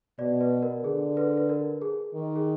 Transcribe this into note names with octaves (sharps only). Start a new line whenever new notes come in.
B2 D5
B4
A#4
D3 G#4
B4
B4
A#4
G#4
D#3
G#4